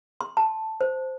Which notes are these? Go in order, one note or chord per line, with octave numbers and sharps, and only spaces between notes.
C6
A5
C5